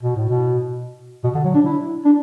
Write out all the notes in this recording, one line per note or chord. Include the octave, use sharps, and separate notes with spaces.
B2
A2
B2
B2
D3
F#3
D4
E4
D4